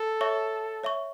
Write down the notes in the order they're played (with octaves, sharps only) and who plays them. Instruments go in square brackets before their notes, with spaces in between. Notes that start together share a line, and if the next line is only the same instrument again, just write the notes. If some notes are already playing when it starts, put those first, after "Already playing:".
Already playing: [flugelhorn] A4
[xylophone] C#5 E5 C#6
C#5 E5 C#6